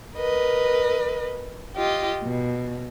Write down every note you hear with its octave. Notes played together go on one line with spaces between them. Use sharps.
A#4 B4 D#5
F4 G4 D#5
B2